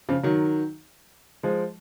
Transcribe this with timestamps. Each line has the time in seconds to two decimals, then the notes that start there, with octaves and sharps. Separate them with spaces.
0.09 C#3 F3
0.23 D#3 F#3
1.43 F3 G#3